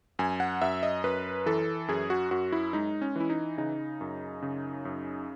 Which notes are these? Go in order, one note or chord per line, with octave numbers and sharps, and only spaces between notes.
F#2 G#5
F#5
F#2 E5
D#5
F#2 B4
E3 A4
F#2 G#4
F#4
F#2 F#4
E4
G#3 D#4
C#4
E3 E4
D#4
C#3 D#4
F#2
C#3
F#2